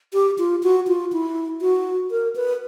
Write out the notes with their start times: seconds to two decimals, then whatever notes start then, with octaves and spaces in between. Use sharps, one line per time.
0.14 G4
0.38 F4
0.63 F#4
0.87 F4
1.13 E4
1.61 F#4
2.11 A#4
2.36 B4